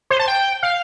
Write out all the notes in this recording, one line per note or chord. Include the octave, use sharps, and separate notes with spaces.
C5
A5
G5
F5